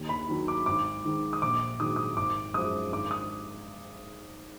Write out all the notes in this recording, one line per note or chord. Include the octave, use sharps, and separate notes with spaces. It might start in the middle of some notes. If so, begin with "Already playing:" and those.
Already playing: D#2
B5
D#3 F#3
D6
G#1 D6
G#2 D#3
D#6
A#1 D6
G#2 D#3 F#3 D#6
D#6
G#1 D6
F#2 F3 G#3 D#6
G#1 D6
D#6